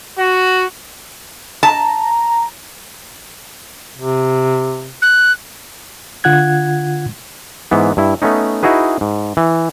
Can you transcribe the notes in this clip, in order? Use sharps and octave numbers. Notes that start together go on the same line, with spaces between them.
F#4
A5 A#5
C3
F#6
D3 F4 F#5 F#6 G#6
G#2 E3 B3
G2 E4
A3 B3 C#4 D#4
D#4 E4 F#4 G#4 B4
G#2
E3